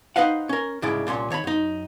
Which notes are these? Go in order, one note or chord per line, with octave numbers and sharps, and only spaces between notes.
D#4 B4 C5 D#5 F5 F#5
C#4 A#4
C2 G#2 C#3 G#3 E4 D5
C2 A#2 C#4 C6
D#3 C#5 A#5 B5
F#2 D#4